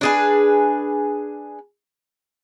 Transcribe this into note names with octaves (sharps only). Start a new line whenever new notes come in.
D4 G#4 B4